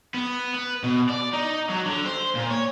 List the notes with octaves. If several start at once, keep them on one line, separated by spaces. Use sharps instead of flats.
B3
B4
B2
D5
D#4
F#3
D3
C5
A#2
C#5